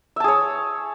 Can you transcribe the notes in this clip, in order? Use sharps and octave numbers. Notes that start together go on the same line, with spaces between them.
G#4 C#5 E5 A5